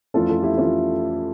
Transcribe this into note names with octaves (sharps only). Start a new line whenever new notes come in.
F2 E3 A3 C#4 F4 A4
F4 A4
E4 G4
E3 A3 C#4 F4